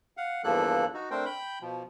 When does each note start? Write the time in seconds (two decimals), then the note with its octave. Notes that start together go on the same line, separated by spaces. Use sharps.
0.17 F5 F#5
0.44 E2 G2 F3 A#3 A4 F#6
0.94 D#4 F#4
1.11 A3 C4 D4 A#4 C5 G5
1.26 G5 B5 G6
1.61 B2 F3